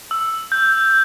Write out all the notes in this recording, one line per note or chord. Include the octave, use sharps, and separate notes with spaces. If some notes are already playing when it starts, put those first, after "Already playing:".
E6
G6